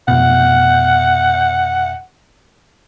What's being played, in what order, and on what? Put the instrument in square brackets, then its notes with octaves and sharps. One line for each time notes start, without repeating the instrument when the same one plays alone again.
[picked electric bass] F1 B2 [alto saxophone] F#5